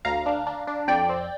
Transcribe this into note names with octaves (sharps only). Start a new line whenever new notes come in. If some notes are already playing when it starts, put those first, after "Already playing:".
D2 F5 A#5
D4
D4
D4
F2 D5 G5
C4